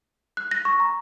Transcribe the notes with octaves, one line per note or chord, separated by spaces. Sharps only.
F#6
A#6
C#6
A#5